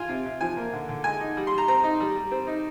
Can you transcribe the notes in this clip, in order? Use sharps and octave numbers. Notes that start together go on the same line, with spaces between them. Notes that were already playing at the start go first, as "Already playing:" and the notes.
Already playing: F4 G#5
C3
C3
F3 G#5
A#3
D3
D3
G#3 G#5
D#4
G3
C6
G3
A#5
C4 A#5
D#4
G3
G3
C4
D#4